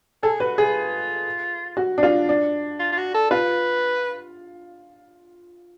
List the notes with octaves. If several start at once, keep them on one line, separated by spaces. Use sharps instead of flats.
G#4 A4
F#4 B4
F4 G#4
F#4
D4
F4
D4
F4
F4
F#4
A4
F4 B4